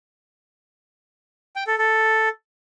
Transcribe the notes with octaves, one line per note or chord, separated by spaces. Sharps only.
G5
A4
A4